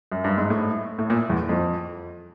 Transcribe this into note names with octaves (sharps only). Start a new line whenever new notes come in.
F#2
G2
G#2
A2
A2
A#2
E2
F2